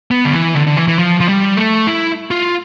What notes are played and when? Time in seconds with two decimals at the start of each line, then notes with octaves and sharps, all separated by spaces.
0.11 B3
0.25 D3
0.33 E3
0.55 D3
0.67 D3
0.77 E3
0.88 E3
0.99 F3
1.21 F3
1.29 G3
1.57 A3
1.87 E4
2.31 F4